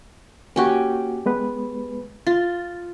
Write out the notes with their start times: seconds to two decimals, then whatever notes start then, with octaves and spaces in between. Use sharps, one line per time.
0.56 A#3 C#4 F#4 G4
1.26 G#3 B3 B4
2.27 F4 A6